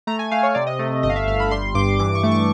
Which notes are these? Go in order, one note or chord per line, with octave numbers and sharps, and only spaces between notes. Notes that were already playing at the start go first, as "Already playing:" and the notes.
A3 A#5
G#5
A3 F5
C#5
C3 D5
D#5
A3
G1 D#5
F5
E5
G1 F5
B5
G3 C6
G2 D6
E3 D6
C#6
A3 D6
C#6